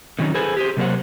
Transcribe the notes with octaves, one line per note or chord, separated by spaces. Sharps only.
D3 D#3 F#3 C#4 D#4
G#4 A4 B4 C5 G#5
G4 G#4 C5
C3 F#3 A#3 C5 F#5